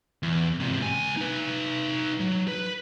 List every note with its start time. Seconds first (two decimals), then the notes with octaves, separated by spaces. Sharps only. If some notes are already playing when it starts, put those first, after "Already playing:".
0.23 E2
0.60 G#2 C3
0.80 C#2 G#5
1.17 D#4 B4
2.20 F#3
2.48 B4